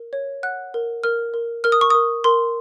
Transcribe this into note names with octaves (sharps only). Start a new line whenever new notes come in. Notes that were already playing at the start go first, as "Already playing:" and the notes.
Already playing: A#4
C#5
F#5 F#6
A#4
A#4 F6
A#4
A#4 F6
D#6
C#6
A#4 D#6
A#4 C6